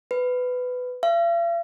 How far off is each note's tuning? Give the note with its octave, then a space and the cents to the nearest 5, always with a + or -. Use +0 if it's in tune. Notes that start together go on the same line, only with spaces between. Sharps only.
B4 +15
F5 -45